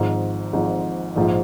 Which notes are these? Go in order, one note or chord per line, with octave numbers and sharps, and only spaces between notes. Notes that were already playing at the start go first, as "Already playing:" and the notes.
Already playing: G#1 G#2 F3
G#1 G#2 F3
A#1 G#2 F3